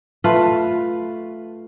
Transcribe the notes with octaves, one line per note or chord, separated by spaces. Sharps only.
A3 F4 B4